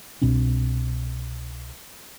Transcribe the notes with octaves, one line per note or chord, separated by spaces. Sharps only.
C2 B2 C4 D4